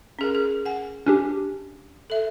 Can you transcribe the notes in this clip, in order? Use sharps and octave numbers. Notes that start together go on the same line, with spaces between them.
C#4 G#4 A#4
G#4
F#5 G#5
C#4 D4 G4
A4 E5